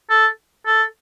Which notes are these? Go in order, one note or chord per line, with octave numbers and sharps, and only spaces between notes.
A4
A4